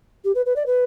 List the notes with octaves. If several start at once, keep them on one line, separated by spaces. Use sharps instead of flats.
G4
B4
B4
D5
B4